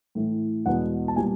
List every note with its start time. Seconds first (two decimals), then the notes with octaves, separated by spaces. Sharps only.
0.15 A2 E3 A3
0.66 E2 B2 G#3 B3 F#5
1.08 A5
1.16 A#2 G3 B3 G#5